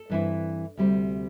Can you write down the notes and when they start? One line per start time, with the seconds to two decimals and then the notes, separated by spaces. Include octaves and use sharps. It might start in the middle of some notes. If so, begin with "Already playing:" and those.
Already playing: A4
0.10 G2 E3 C4 E4
0.77 D2 C3 G3 C4